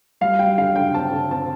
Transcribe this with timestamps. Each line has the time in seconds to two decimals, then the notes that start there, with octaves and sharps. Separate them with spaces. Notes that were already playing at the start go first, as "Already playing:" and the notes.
0.21 G3 F5
0.39 G3 G5
0.58 D3 F5
0.76 D3 G5
0.94 C4 A5
1.13 D3
1.31 C4 A5